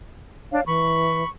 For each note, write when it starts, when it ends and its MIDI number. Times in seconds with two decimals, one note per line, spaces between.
0.52 0.61 62
0.52 0.65 73
0.52 0.61 77
0.66 1.24 52
0.66 1.28 83
0.66 1.28 85